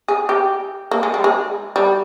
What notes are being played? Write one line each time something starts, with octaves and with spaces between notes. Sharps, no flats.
G#4
G4
A#3
G#3
G3
G#3
G3